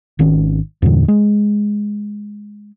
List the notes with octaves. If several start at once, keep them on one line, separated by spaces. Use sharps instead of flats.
G#1 D#3 C#4
E2 G2 A#2 D3
G#3